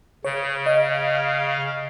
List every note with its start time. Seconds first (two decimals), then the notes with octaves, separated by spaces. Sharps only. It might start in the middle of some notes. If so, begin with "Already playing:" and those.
0.25 C#3 C#5
0.66 D#5 F5